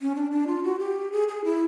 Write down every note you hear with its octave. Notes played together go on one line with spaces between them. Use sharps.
C#4
D4
D4
F4
F#4
G4
G#4
G#4
E4